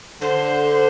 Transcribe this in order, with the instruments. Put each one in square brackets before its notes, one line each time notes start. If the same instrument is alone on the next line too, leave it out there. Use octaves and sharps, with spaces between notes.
[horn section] D3 [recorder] C5